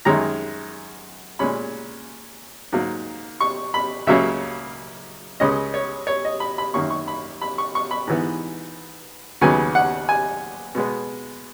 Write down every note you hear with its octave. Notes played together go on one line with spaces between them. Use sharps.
F#2 D#3 G#3 C#4 A#5
A#2 G#3 C#4 B5
G#2 F#3 A#3
C#6
B5
C#2 C#3 F#3 A#3 C#4 E5
C#2 C#3 G#3 C#4 D#5
C#5
C#5
D#5
B5
B5
F#2 D#3 A#3 C#4 C#6
C#6
B5
B5
C#6
C#6
B5
G#2 E3 B3
D#2 C#3 F#3 B3 G#5
F#5
G#5
B2 G#3 B3